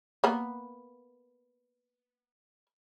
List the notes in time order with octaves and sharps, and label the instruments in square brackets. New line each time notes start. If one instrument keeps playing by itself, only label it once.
[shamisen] A#3 B3